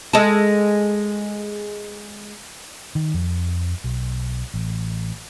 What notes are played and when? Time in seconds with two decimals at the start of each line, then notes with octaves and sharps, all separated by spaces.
0.13 G#3 A4
2.95 D#3
3.14 F2
3.84 B1
4.54 A1